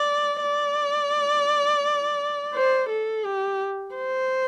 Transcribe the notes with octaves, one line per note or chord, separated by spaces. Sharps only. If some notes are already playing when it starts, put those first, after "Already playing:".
Already playing: D5
D5
C5
A4
G4
C5